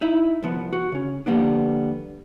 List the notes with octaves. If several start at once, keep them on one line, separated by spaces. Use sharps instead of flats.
D#4 E4 E5
C2 F3 B3
F#4
C#3 C#4
D3 F3 G3 A#3 B3 D4